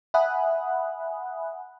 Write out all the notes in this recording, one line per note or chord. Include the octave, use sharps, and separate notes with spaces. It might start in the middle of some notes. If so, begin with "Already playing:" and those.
E5 F#5 G#5 B5 D#6 F#6